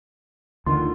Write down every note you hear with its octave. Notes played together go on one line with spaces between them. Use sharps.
D2 D3 D#3 F4